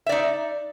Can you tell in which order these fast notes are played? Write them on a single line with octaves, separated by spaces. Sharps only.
E5 D5 D#4